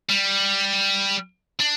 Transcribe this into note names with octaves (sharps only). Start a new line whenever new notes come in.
G3
D4